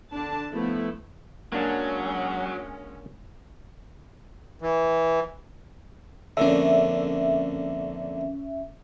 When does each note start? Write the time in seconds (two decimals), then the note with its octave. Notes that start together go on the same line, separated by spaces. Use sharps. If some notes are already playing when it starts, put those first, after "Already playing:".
0.12 D3 D4 A5
0.51 F3 A3 B3 E4
1.52 F#3 G#3 A#3 C#4 D4 F#4
4.62 E3
6.37 F2 A#2 D3 C#4 E5